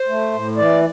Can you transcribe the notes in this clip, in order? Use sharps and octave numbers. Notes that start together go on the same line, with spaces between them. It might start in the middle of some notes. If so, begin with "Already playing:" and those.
Already playing: C5
A3
A2
E3 D5